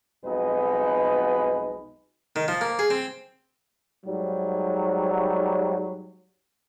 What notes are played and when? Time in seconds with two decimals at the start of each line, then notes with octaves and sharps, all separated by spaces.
0.25 B1 F2 B2 G#3 D#4 B4
2.36 D#3
2.48 F3
2.61 A#3
2.79 G#4
2.90 C4
4.05 G#2 F#3 G3